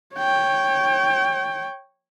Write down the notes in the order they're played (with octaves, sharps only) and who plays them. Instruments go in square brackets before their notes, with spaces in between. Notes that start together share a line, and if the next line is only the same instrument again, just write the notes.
[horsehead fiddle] C#5 G5